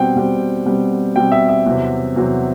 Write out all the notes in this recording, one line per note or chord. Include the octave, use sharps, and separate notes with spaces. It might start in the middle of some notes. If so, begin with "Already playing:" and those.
Already playing: B2 G3 C4 F#5 G5
B2 G3 C4
B2 G3 C4
B2 G3 C4 G5
E5
E5
E2 C3 F#3 C4
E2 C3 F#3 C4